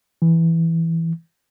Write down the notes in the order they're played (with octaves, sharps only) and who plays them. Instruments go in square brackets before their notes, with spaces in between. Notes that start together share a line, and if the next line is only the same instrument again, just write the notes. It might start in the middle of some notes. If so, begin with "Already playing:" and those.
[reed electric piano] E3